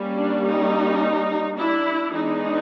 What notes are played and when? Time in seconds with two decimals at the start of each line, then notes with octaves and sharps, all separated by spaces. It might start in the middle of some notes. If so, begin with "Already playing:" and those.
Already playing: G3 A#3 C#4
0.17 D4
0.45 D#4
1.57 D4 E4
2.14 E3 G#3 B3 D4 D#4